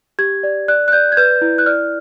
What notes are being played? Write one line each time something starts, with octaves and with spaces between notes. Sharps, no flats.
G4 G#6
D5
D5 F#6
F#6
D5 G6
G#6
B4 G6
E4
F#6
D5 F6